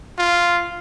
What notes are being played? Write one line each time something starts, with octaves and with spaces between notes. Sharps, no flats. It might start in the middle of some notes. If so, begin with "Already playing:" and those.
F4